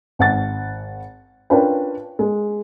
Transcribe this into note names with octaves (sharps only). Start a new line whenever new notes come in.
G#1 F#5 A6
C#4 D4 F4 A#4 B4 G5
G#3